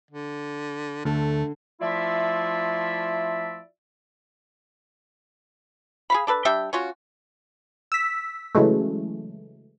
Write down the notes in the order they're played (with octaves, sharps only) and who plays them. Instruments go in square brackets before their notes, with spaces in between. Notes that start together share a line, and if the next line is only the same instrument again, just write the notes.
[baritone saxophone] D3
[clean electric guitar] D2 [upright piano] D3 [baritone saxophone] A3
[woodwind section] F3 A3 E4 F4 D5 E5
[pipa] G#4 F5 B5
D4 A4 B4
G3 D4 E5 G5
C#4 F4 F#4
[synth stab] E6 B6
C#3 E3 F#3 G#3 A3